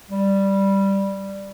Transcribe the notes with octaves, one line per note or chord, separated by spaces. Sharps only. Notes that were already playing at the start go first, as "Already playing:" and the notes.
G3